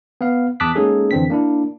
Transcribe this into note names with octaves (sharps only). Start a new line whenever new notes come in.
B3 F5
E2 A5 D6 D#6 F#6 B6
G#3 A#3 C#4 D#4 G#4 A4
F2 D3 E3 C4 D4 B6
A#3 D4 E4